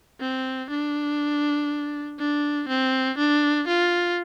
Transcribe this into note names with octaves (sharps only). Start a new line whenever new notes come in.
C4
D4
D4
C4
D4
F4